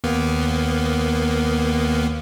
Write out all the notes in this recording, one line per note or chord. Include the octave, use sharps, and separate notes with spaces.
D#2 A#3 B3